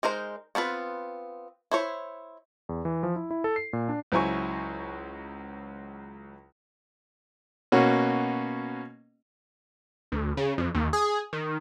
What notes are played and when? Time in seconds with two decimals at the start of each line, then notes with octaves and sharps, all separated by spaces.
0.03 G#3 D#4 A#4 C5
0.55 B3 C4 F4 B4
1.71 E4 C5 C#5
2.69 E2
2.85 E3
3.03 F3
3.16 E4
3.31 E4
3.44 A4
3.56 C7
3.73 A#2
3.89 D4
4.12 C#2 F#3 E4 C5 G#5 C#6
7.72 B2 A#3 C#4 F#4
10.12 D2
10.37 C#3
10.58 F2
10.75 D#2
10.93 G#4
11.33 D#3